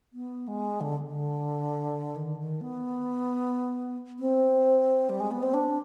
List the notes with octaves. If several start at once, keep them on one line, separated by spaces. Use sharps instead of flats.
B3
G#3
D3
D3
D#3
D#3
B3
C4
G3
G#3
B3
C4
D4